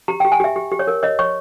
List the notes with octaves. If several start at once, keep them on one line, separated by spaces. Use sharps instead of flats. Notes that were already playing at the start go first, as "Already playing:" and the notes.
G4 A#5
G4 G5
G#5
G4 E5
G4
G4
C#5
A#4
C#5 D#5
C#5 C#6